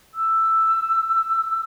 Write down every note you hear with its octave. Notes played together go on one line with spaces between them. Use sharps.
E6